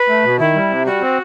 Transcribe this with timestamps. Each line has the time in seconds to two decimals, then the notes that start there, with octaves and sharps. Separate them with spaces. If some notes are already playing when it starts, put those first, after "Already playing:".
Already playing: B4
0.09 A3
0.24 B2
0.39 D#3 E4
0.54 G3
0.70 C3
0.85 G3 F#4
1.01 C4